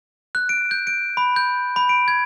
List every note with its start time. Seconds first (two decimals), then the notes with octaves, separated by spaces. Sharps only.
0.35 F#6
0.49 D7
0.71 G6
0.87 D7
1.17 B5
1.36 G6
1.76 B5
1.89 D7
2.08 G#6